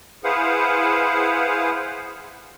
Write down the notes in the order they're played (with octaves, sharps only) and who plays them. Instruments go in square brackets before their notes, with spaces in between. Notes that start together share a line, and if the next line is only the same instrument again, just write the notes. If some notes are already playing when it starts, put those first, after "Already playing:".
[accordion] E4 G#4 B4 C5 F5 F#5